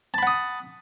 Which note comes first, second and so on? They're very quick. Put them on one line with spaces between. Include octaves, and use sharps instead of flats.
A5 B5 F#5 D#6